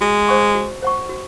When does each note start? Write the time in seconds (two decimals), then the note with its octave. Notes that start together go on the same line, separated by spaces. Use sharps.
0.01 G#3 F#4
0.28 C5 F#5 C#6
0.55 F#4
0.82 C5 F#5 C#6
1.09 F#4